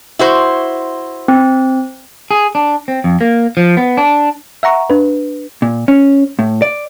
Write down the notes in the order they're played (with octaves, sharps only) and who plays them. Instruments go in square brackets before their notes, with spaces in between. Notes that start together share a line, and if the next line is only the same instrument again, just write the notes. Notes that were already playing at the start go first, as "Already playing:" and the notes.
[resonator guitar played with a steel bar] E4 F#4 C5
[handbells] C4
[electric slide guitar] G#4
D4
C4
F2
A#3
F3
B3
D4
[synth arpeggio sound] E5 F#5 A#5 C#6
D4 B4
[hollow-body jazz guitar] A#2
C#4
A2
D5